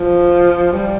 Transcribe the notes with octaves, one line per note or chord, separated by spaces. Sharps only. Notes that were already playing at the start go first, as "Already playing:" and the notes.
Already playing: F3
G3